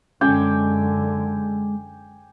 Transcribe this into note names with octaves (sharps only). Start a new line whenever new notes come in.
F#2 D3 G#3 C#4 G5 G#5 D6